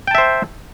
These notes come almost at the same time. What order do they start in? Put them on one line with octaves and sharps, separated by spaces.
G5 A5 E5 C5